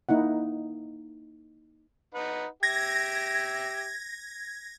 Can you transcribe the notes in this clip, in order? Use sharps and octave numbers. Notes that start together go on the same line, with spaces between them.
A#3 D#4 E4 F#5
D#4 B4 F#5
G4 E5 G#6 A#6